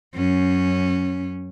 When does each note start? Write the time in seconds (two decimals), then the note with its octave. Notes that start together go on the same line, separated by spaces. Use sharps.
0.15 F#2 C#4